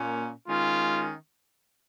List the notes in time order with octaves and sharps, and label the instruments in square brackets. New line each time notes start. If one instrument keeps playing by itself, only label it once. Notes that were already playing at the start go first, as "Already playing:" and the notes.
Already playing: [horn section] A#2 A#3 C#4
D#3 G#3 C#4 F4